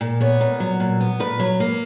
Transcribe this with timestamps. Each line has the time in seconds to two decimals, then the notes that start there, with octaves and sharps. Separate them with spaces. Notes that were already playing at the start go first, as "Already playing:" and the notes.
0.01 A#2
0.20 B3 C#5
0.40 A#2
0.60 F#3
0.80 A#2
1.00 B3
1.20 A#2 B4
1.40 F#3
1.60 A#3